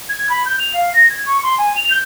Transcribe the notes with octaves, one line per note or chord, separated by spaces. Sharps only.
G#6
B5
G6
F7
F5
A#6
G#6
C#6
C6
G#5
F7
G6